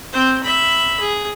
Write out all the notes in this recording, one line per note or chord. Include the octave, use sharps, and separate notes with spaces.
C4 C5
E5 B5
G#4